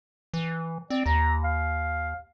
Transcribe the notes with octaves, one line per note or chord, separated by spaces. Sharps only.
E3
C4 D5
D#2 A#5
F5